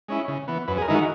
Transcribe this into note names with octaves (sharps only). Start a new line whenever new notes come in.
G#3 C#4 E4
C#3
E3 B3
F#2 B4
G#4
A#4
D#3 G#3 D#4 E4
F#4